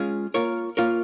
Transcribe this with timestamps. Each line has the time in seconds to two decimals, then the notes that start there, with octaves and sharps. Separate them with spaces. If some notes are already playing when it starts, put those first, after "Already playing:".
Already playing: G#3 C#4 F4 G#4
0.34 A#3 F4 A#4 C#5
0.77 A#3 F4 A#4 C#5